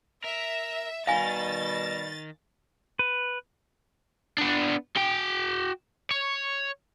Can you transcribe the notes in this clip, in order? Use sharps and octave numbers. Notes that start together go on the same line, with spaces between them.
A#4 E5
B2 D#3 G3 D#4 F5 G#5 A6
B4
B3 D4
F#4 G5
C#5